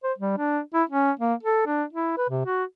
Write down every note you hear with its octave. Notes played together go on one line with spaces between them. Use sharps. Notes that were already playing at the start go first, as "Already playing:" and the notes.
C5
G3
D4
E4
C#4
A#3
A4
D4
E4
B4
C3
F#4